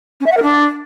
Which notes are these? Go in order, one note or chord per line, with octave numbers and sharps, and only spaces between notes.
C#4
E5
F#5
A#4
D4